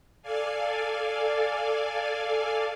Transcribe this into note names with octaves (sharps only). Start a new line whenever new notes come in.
A4 D5 F5 G#5